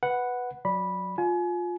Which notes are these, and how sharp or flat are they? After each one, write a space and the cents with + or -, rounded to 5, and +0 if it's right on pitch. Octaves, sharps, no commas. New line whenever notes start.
B4 +0 F#5 +0
F#3 -15 D5 +0 B5 -10
F4 +15 G#5 +30